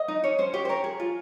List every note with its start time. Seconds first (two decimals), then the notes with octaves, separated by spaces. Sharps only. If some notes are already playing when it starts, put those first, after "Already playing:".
Already playing: D#5
0.08 D#4
0.24 C#4 C#5
0.39 C#4 C5
0.54 G4 C#5
0.65 C5
0.69 A#4 C#5
0.84 G#4
1.00 F4